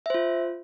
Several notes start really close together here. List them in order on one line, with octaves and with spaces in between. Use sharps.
E5 C5 F4